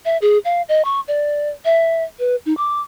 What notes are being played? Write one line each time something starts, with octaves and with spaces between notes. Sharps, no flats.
E5
G#4
F5
D#5
C#6
D5
E5
B4
D#4
D6